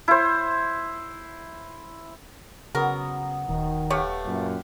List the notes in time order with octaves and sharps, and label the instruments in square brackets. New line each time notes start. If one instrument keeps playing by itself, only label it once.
[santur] E4 C5
[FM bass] C#3 [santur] F#3 B3 [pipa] A#4
[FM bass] D#1 [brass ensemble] D#3
[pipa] A3 B4 C#5 [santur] G4 F5 F#5
[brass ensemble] F#2 A#2